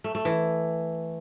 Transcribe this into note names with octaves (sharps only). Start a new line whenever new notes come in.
A3
A3
E3